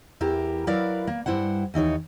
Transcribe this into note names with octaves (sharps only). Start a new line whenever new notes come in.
E2 E4 G4 A#4
F#3 E4 A#4 B4 D5 F5
A#3
G2 E3 E4 C5 F#5
D#2 E3 D#4 C#5